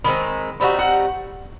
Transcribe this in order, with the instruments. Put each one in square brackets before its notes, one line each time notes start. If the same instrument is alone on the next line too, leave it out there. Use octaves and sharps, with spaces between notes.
[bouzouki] D#3 G#3 C4 [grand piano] B5
[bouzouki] G3 C4 D#4 F#4 [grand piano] B5
[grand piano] F#5